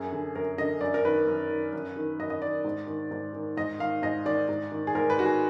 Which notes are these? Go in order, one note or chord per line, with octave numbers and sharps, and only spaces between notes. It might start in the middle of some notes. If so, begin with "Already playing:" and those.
Already playing: F#2 G#4
D3
F#2 A#4
D3 D#5
F#2 D5
A#4
D#3 B4
F#2
D#3
F#2
D#3
F#2 D#5
D#5
D#3 D5
G#2
D#3
G#2
D#3
G#2 D#5
D#3 F5
G#2 D#5
D#3 D5
G#2
D#3
G#4
G#2 A#4
B4
D#3 F#4
G#4